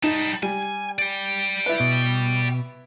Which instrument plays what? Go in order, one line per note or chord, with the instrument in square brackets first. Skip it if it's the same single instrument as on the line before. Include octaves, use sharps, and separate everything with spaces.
[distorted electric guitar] G3 A5 [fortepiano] D#4
[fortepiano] G3 [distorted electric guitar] G#5
[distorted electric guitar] D5 G5
[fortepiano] E4 B4
[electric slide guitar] B2